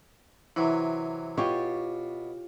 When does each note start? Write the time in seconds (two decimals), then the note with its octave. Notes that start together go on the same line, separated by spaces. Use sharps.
0.56 C3 E3 F#3 E4
1.38 B2 F4 G4 C#5